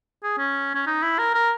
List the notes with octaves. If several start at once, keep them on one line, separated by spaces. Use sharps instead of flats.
G#4
C#4
C#4
D#4
E4
A#4
A#4